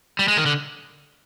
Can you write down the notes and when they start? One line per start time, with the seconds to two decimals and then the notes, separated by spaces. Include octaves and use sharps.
0.19 G3
0.28 G#3
0.38 D#3
0.46 D3